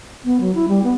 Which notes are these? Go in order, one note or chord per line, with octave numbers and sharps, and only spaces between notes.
B3
F#3
E4
G3
B3